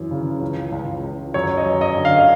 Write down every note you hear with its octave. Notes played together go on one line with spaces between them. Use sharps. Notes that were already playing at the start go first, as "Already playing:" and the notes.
Already playing: F#2 E3
C#3
C#2
C#2
C#2
F#2 C#5
D#5
F#2
D#5
D3
F5